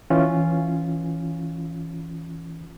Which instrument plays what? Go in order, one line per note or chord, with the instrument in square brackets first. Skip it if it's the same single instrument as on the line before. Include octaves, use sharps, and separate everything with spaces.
[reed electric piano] E3 C#4 F4